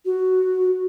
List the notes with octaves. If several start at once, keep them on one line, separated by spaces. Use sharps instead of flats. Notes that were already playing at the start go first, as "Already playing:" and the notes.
F#4